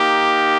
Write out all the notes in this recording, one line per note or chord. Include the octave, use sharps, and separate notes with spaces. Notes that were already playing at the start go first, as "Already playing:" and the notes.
Already playing: A#3 D#4 G4